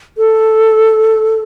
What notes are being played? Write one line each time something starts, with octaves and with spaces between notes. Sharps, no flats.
A4